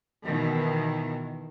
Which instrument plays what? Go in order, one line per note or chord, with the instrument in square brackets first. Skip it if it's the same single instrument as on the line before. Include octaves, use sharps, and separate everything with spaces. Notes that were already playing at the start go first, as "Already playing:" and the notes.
[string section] B2 D#3 E3